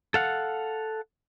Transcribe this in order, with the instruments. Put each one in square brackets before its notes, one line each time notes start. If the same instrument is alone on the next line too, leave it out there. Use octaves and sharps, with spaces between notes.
[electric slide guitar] A4 F5 F#5